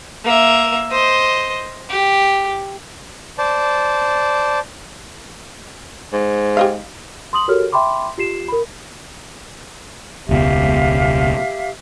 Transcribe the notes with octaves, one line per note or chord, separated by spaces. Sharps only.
A#3 E5
C5 D#5
G4
C5 D5 A5
G#2
G4 D#5 F5
C6 D#6 F#7
F#4 G4 A4 A#4 C#5 F6
E5 G5 B5 C6 D6
F4 G4 C7 E7
A#4 B5
E1 C#2 B2 G4 E5 F5